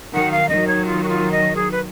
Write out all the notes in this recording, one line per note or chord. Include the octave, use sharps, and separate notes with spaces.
D#3 F#3 F#5
F5
D#3 F#3 D#5
C#5
F4
F#4
F4
D#5
G#4
B4